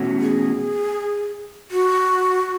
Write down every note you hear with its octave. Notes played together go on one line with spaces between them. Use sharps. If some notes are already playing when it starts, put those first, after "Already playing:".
Already playing: E2 B2 A3 C#4 F#4
G#4
F#4